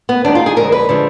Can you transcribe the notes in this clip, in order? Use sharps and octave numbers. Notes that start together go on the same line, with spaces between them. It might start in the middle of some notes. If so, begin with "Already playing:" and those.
B3
D#2 D#3 G#3 D4
F4
G#4
F2 D3 G#3 A#4
B4
D3 F3 G#3